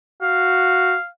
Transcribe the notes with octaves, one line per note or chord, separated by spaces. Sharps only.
F#4 F5